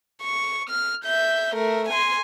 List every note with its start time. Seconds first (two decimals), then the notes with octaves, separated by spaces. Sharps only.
0.23 C#6
0.70 F6
1.04 E5 G6
1.55 A3 A#4
1.89 G#5 C6